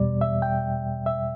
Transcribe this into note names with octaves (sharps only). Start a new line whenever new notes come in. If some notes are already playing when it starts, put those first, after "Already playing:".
Already playing: E2 B2 G3 D5
E5
G5
E5